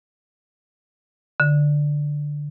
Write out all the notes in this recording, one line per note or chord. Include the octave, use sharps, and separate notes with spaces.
D3